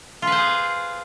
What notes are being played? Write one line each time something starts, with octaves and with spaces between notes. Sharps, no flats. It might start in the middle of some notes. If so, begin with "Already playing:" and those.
F4 G#4 B4 C5